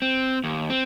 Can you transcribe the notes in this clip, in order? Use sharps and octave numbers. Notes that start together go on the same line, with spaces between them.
C4
D#2
C4